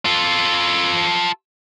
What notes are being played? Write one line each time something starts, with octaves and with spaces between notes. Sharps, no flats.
F4 A4